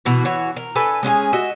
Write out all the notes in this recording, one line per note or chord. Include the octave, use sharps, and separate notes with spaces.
B2 E3 F#4
E3 F#4 C#5
A#4
D4 A4 B4 G#5
G#3 C#4 F4 G#4
F#4 D#5 E5